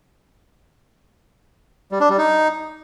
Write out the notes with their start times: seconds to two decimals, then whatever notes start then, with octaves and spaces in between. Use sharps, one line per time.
1.92 G3
2.01 D4
2.09 G3
2.18 D#4